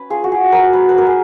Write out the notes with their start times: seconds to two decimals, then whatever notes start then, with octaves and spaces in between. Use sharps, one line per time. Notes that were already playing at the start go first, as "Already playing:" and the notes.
Already playing: C#4 B4
0.10 F4 G#4
0.24 F#4
0.32 G#4
0.52 F#3 A#4
0.73 B4
0.89 B4
0.94 F#3 A#4
1.07 G#4